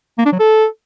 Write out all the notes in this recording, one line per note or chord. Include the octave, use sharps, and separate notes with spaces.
A#3
D4
F#3
A4